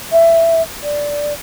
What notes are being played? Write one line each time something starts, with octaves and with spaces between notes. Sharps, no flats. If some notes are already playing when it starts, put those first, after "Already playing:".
E5
D5